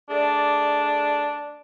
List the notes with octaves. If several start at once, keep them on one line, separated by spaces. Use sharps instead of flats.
A3 D4 G#4 D5